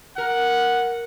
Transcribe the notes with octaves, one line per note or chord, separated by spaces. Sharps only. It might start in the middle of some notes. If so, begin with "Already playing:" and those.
A#4 F#5